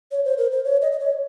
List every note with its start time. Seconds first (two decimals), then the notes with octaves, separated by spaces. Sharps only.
0.12 C#5
0.25 C5
0.38 A#4
0.52 C5
0.65 C#5
0.82 D#5
0.92 D#5
0.99 C#5